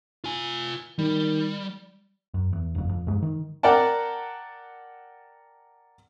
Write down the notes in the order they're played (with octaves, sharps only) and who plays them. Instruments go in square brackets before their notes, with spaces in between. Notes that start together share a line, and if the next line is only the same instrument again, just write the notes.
[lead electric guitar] F4 G#5
[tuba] D#3 [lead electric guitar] G3
[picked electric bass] F#2
E2
F#1 F2
F2
G2 G#3
D#3
[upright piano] A#4 D5 F#5 G5 A5